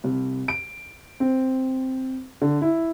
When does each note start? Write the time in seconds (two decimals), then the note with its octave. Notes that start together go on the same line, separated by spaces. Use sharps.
0.04 C2
0.48 D7
1.20 C4
2.42 D3
2.61 E4